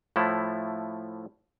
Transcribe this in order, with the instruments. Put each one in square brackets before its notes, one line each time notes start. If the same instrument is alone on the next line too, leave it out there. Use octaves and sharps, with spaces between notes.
[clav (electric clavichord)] A2 F3 A3 E4